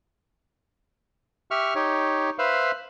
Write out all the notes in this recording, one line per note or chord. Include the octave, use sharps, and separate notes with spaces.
G4 E5 C#6 F6
D#4 G4 C#5
B4 C5 E5 F5 B5